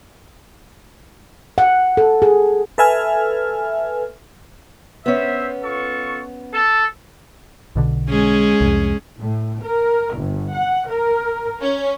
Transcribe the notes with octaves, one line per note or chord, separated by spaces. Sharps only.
F#5
A4
G#4
A4 B4 E5 G#5 F6
B3 C#4 C5 E5
F4 A4 C#6
A4
B1 B2 D3
G#3 C#4 G#4
C2 F2
A2
A#4
G1
F#5
A#4
C#4